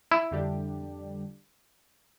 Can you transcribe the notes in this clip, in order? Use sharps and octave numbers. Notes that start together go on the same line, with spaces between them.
E4
F2 D3 G3 D4 G4